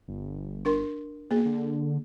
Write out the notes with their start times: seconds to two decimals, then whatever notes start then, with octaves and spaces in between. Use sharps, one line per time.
0.08 G1
0.65 D4 A#4 C6
1.31 B2 A#3 G#4
1.46 D3